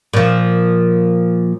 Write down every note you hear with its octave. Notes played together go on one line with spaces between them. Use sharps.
A#2 F3